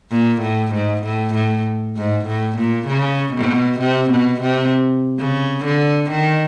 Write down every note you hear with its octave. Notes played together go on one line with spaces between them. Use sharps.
A#2
A2
G#2
A2
A2
G#2
A2
A#2
C#3
B2
C3
B2
C3
C#3
D3
D#3